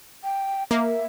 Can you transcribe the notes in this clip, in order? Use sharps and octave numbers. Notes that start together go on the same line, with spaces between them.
G5
A#3 E5